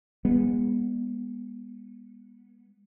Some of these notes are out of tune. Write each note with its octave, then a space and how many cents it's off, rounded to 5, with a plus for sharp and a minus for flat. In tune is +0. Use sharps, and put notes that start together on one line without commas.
G#3 -35 B3 -25